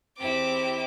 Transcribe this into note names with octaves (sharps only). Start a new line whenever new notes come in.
E2 C4 E4 G4 D6